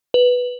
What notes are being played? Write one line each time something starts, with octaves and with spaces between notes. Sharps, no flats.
B4